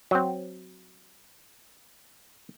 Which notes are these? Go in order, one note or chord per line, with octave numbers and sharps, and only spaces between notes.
F#3 C4